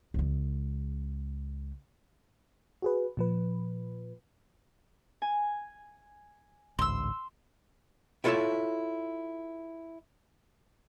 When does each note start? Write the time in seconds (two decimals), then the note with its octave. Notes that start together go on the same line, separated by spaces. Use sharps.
0.14 C#2 G#3
2.82 F#4 G#4 B4
3.17 A#2 F3 B4
5.22 G#5
6.79 A1 D2 G#2 C6 E6
8.24 E4 F4 A4 A#4 C#5 E5